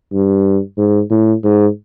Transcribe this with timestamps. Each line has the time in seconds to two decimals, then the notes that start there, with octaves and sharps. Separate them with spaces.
0.13 G2
0.78 G#2
1.10 A2
1.44 G#2